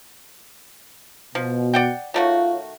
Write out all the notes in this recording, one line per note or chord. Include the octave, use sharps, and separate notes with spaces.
B2 F3
D5 F#5 G5
D#3 A3 F4 F#4 C#5 F5